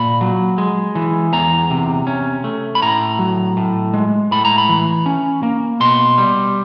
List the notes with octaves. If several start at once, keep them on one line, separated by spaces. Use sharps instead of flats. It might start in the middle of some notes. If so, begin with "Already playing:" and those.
Already playing: A#2 B5
F#3
G#3
E3
E2 A#5
C3
C#4
A3
B5
A2 A#5
F#3
A2
G#3
A2 B5
A#5
B5
E3
C#4
A#3
B2 C6
G3